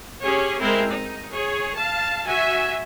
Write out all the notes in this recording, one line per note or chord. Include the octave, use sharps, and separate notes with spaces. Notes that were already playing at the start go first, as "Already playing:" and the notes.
C#4 G4 G#4 C#5
G#3 C4 E4 A#4
D#4
G#4 C#5
F5 A5
F#4 E5 G#5